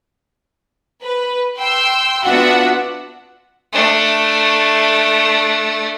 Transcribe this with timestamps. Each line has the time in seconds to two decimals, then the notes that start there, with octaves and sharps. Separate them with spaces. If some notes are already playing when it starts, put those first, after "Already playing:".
1.02 B4
1.56 G5 C6 E6
2.23 B3 D4 F4 F#4 E5 F#5
3.73 A3 D4